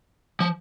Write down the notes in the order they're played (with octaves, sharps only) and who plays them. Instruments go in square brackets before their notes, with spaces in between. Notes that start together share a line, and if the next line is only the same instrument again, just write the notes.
[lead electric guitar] F3